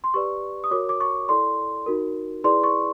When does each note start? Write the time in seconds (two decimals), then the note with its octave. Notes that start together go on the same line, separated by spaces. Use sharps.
0.04 C6
0.14 G4 B4 D5 C#6
0.64 D#6
0.71 F#4 A#4 C#5 D6
0.89 D6
1.00 C#6
1.29 E4 A4 D5 C6
1.86 D#4 F#4 A#4
2.44 E4 G#4 B4 D5 C6
2.63 C#6